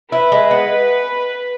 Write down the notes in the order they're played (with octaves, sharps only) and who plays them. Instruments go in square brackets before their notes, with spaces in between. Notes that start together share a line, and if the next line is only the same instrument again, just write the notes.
[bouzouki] E4 [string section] B4
[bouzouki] G#3
B3